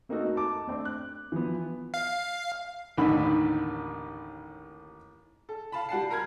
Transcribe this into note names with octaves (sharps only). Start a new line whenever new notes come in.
A3 A#3 C4 D#4 F#4 A4
A5 D6
A3 C4 D4
F#6
E3 F3 B3
F5
A1 D#2 D3 D#4 B5
A4
F5 A5 B5
G3 F#5 A5 C7
A#4 A#5 B5 F6 G#6